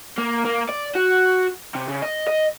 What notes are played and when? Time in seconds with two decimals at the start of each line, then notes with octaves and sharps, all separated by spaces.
0.18 A#3
0.45 A#3
0.69 D5
0.96 F#4
1.75 C3
1.89 C#3
2.03 D#5
2.27 D#5